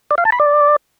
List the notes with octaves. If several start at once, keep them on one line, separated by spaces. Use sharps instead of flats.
D5
F5
A5
B5
D5